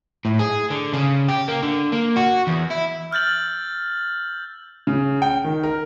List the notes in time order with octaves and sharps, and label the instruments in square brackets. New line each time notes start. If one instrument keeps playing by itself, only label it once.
[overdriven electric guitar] A2
G#4
D3
C#3
G4
A#3
D3
A#3
F#4
E2
E4
[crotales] E6 F6 G6 A6 F#7
[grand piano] C#3
G5
D#3
A#4